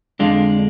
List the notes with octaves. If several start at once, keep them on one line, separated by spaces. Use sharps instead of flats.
F2 D3 G#3 D4 F4